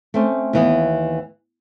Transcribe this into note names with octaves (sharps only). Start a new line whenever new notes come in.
A3 C4 C#4
D#2 E3 B3